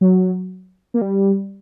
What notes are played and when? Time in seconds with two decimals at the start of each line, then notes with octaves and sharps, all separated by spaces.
0.01 F#3
0.94 A#3
1.01 G3